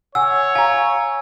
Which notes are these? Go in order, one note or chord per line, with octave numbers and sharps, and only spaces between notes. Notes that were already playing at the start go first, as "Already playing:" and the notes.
C#5 F#5 G#5 E6
F5 G#5 A#5